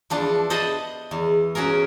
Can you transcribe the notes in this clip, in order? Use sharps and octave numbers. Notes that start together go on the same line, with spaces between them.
E2 F3 D4
C5 D#5 F#5 A5 B5
E2
C#4 F#4 G#4 A#4